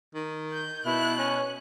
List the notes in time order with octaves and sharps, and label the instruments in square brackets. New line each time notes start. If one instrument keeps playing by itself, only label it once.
[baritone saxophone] D#3
[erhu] G6
[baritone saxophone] B2 [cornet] E4 [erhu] F#6
[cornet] C#4